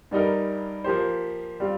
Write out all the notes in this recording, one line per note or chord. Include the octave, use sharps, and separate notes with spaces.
G2 G3 D#4 A#4
F3 A#3 G4 C5
G3 C4 F4